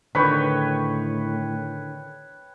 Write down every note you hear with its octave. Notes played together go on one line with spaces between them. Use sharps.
A2 D3 D#3 B4 C#5 G5 B5